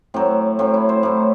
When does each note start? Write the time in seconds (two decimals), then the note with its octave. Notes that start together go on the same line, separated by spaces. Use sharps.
0.14 A2 F#3 C4
0.59 A2 F#3 C4
0.74 E4
0.89 C5
1.03 A2 F#3